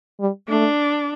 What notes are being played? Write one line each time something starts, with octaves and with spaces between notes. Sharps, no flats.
G3
A3 D4